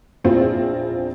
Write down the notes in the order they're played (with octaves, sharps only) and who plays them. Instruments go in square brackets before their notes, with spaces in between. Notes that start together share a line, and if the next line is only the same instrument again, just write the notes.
[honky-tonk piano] A#1 E2 C4 E4 F4